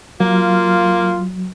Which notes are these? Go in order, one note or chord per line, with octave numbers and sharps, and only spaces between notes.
F#3 A#3 F4